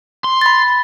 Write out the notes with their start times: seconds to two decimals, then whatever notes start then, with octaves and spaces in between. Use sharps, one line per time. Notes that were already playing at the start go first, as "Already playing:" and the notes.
0.24 C6
0.41 B5 A6